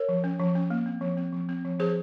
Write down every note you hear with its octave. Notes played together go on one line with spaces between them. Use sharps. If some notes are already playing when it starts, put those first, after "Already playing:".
Already playing: A#4 C#5
F3
C#4
F3
C#4
A#3
C4
F3
C4
F3
C4
F3
F3 G#4 C5